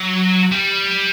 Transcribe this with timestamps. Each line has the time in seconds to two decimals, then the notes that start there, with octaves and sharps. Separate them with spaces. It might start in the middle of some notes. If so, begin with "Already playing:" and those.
Already playing: F#3
0.52 G3